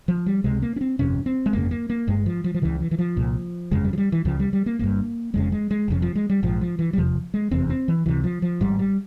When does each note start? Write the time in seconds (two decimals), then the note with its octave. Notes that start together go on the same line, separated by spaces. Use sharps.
0.08 F3
0.26 G3
0.44 C#2 C3 G#3
0.62 A#3
0.76 C#4
0.81 C4
0.99 G1 F2 C3 C#4
1.26 C4
1.46 G#3
1.53 G1 F2 C#3 A#3
1.71 A#3
1.90 A#3
2.07 G1 G2 G#3
2.26 F3
2.44 F3
2.54 F3
2.62 C#2 C#3 E3
2.80 E3
2.91 E3
2.99 F3
3.16 C2 A#2
3.71 G1 F2 C#3 G#3
3.84 G3
3.93 F3
3.98 G3
4.12 E3
4.25 C#2 C#3 F3
4.40 G3
4.53 G3
4.66 A#3
4.79 G1 G2 A#3
5.34 F1 F2 C#3 G#3
5.52 G#3
5.71 G#3
5.88 F1 F2 C#3
6.02 F3
6.15 G#3
6.30 G3
6.43 A#1 G#2 F3
6.61 F3
6.79 E3
6.93 G3
6.97 F1 E2 C3 F3
7.34 G#3
7.51 F1 E2 C3 C4
7.70 C4
7.88 E3
8.06 C#2 C3 E3
8.24 F3
8.42 F3
8.61 G#1 G#2 G3
8.79 G3